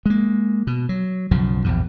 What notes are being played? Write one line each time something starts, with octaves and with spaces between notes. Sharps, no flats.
G#3 A#3
B2
F#3
B1 F#2 C#3 F3
A#1 E2 G2